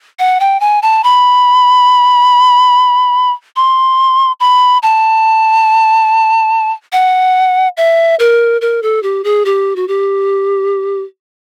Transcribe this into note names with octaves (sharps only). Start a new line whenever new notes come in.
F#5
G5
G#5
A5
B5
C6
B5
A5
F#5
E5
A#4
A#4
A4
G4
G#4
G4
F#4
G4